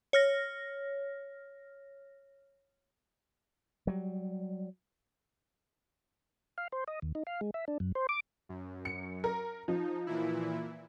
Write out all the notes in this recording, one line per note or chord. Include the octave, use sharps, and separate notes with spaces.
C#5 F6 A#6
F#3 G3
F5
C5
D#5
D#2
D#4
F5
G#3
E5
D4
F#2
C5
D6
F#2
C#7
A#4
F3 D#4
A#2 E3 E4